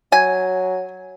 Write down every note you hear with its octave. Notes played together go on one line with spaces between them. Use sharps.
F#3 G#5